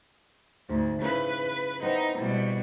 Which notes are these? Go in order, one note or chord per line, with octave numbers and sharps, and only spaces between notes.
D2 G#2
C#3 E4 B4
B3 C4 D#4 E5
B2 G3 E4